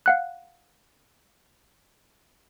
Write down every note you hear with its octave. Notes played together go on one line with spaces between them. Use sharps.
F5 F#5 F#6